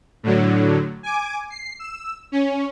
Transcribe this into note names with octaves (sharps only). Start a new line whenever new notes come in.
A2 D3 F#3
G#5 D6
C7
E6
C#4